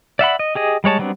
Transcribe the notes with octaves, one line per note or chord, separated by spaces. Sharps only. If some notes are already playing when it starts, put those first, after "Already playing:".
D5 E5 F#5 B5
D#5
G4 G#4 D#5
G3 G#3 C#5 A5
F#3 G3 B3 C4 D4